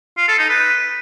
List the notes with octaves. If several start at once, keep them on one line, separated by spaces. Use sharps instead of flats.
F4
A4
D#4
B4